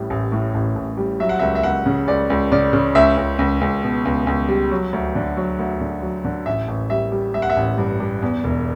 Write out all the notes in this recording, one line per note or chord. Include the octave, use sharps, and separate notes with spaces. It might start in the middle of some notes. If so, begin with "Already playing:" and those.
Already playing: A1 A2 G3
A1
A2
A1
A1
G3
F#3 E5
F#5
C#2 E5
E5
C#2 F#5
C#3
C#2 D5
C#2
C#3 D5
C#3
C#2 E5
C#2
C#2
C#2
B2
C#2
C#2
G3
F#3
D2
D3
F#3
D2
D3
F#3
D3
A1 E5
A1
G3 E5
G3
G3 E5
F#5
E5
A1
G2
G2
E2
E1